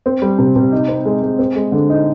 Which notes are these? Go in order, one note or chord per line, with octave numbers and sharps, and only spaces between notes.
C4
G3
C3
C3
D#4
C4
G#3
G#3
C4
G#3
D3
D#4